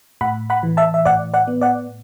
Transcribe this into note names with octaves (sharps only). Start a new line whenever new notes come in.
A2 F#5 B5
F#5 B5
E3
E5 A5
E5
A2 D5 F#5
D5 F#5
B3
D5 F#5